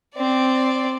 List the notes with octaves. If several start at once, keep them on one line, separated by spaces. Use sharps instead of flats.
C4 D5